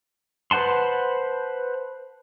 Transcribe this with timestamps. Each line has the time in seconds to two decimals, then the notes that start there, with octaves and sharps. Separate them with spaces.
0.51 B4 C5 F#5 A5 C6